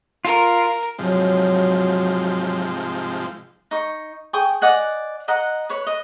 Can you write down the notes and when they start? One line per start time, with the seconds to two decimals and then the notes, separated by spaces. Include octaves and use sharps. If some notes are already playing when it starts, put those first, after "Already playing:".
0.25 F4 A#4
0.99 G#2 C3 F3 F#3
3.71 D#4 C#6
4.33 G#4 G5 C#6 D#6
4.62 D5 D#5 F#5 G#5
5.28 D#5 F#5 A#5
5.69 B4 C#5
5.87 D#5